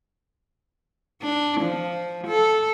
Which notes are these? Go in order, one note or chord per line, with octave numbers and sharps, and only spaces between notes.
D4
F3
A4